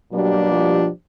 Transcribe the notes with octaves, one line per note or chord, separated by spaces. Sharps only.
B2 F#3 G3 A#3 D4 G4
F3